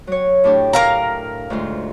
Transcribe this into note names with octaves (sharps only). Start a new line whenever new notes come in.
F#3 C#5
A2 D4 G4
A#4 F5 A#5
D2 G#2 F4